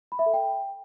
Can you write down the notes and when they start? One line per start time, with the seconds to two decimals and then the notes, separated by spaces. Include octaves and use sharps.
0.12 B5
0.19 E5
0.26 A4
0.33 G5